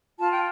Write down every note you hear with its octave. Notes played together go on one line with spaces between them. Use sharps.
F4 A5
G5